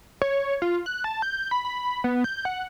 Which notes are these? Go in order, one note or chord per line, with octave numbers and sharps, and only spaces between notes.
C#5
F4
F#6
A5
G6
B5
B5
B3
G6
F#5